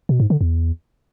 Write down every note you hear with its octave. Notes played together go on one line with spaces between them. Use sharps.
B2
G#2
D3
E2